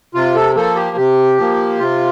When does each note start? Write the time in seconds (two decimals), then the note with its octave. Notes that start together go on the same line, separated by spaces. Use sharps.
0.14 C3 F4
0.35 A4
0.55 F3 A#3 A4
0.76 G4
0.97 C3 G4
1.38 F3 A#3
1.79 C3 F4